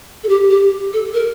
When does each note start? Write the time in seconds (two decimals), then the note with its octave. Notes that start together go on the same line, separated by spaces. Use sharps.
0.23 A4
0.29 G4
0.50 G4
0.93 A4
1.14 A#4